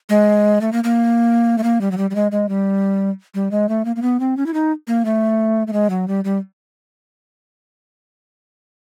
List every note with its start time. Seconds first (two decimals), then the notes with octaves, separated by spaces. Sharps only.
0.09 G#3
0.61 A3
0.72 A#3
0.84 A#3
1.58 A3
1.63 A#3
1.81 G3
1.91 F#3
1.98 G3
2.10 G3
2.15 G#3
2.32 G#3
2.49 G3
3.35 G3
3.51 G#3
3.69 A3
3.85 A#3
3.96 A#3
4.02 B3
4.20 C4
4.37 C#4
4.46 E4
4.54 D#4
4.87 A#3
5.05 A3
5.67 A3
5.73 G#3
5.90 F#3
6.08 G3
6.24 G3